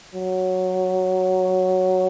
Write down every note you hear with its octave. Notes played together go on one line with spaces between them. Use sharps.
F#3